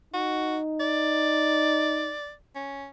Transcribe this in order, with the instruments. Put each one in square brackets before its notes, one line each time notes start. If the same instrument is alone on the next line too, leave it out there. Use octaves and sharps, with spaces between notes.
[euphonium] D#4 [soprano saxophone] F#4
[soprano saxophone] D5
C#4